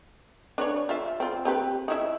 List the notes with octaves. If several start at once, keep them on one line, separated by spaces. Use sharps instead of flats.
D4 B4 C#5
F4 E5
C4 F4
C4 G4 B4
D#4 E4 E5